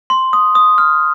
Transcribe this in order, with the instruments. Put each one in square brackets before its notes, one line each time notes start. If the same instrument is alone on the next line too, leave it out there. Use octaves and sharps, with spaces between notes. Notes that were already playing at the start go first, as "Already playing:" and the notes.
[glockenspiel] C6
D#6
D#6
F6